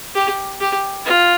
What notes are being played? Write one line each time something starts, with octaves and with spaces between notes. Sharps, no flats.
G4
G4
F4